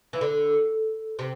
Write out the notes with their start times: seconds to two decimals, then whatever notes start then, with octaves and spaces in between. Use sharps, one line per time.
0.13 E3
0.21 D3
1.19 C3